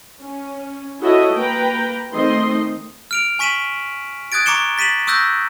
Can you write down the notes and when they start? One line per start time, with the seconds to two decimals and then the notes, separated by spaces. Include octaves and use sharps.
0.21 C#4
1.01 E4 F#4 A4 C#5 D#5 E5
1.32 A#3 B4 G5 A#5
2.13 D#3 A3 C4 D#5 C6
3.11 F6 D7 F7
3.39 G#5 C#6 B6 D#7 E7 F#7
4.32 D#6 F#6 G#6 A6 D7
4.46 A#5 C#6 D6 C#7 E7 G7
4.78 A6 B6 D#7 E7 F#7
5.07 C#6 D#6 E6 F#6 G6 A#6